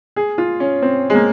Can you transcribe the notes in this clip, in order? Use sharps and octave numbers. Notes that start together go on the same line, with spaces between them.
G#4
F4
C#4
C4
G#3
A#3